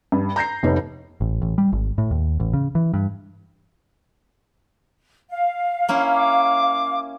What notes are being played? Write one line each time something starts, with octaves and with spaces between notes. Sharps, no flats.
G2
A#5 G6 A#6 C7
F1 C3 B3 D#4 C#5
A1
A1
G3
G#1
A2
D#2
A1
C#3
E3
G2
F5
A#3 C#4 E4
D6